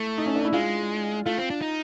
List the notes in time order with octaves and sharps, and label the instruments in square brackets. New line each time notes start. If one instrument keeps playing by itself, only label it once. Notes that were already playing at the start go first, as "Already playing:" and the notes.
Already playing: [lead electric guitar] A3 [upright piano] E4
[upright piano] D#4
C#4
D4
E4
[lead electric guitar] G#3 [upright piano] F4
[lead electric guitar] A3 [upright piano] F4
[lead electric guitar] C4
D4
D#4